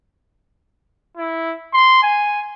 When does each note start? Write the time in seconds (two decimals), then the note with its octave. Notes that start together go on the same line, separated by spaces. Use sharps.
1.17 E4
1.73 C6
2.03 G#5